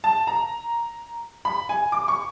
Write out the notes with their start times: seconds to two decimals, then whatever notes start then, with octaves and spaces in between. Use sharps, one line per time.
0.04 A5
0.27 A#5
1.45 B5
1.69 G#5
1.92 D6
2.08 C#6